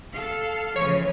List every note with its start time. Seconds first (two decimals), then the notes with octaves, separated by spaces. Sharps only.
0.14 A4 F5
0.76 C#3 E3 F3 C#5